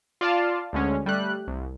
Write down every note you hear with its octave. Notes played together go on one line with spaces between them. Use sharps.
F4 D5 F5 A5
D2 D3 G#3 C#4
G3 A3 F#6
C2